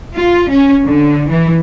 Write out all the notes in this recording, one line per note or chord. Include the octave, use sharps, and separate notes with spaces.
F4
C#4
D3
E3